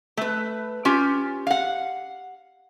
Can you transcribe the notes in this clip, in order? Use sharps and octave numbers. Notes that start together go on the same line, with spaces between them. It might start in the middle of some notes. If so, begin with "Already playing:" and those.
A3 B4
C#4 F4 G4
F5 F#5